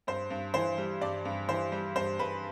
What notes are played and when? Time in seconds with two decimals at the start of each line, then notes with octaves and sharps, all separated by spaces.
0.07 G2 C5
0.30 G2
0.54 E3 C5
0.78 G3
1.01 G2 D5
1.25 G2
1.48 E3 C5
1.72 G3
1.95 G2 C5
2.19 G2 B4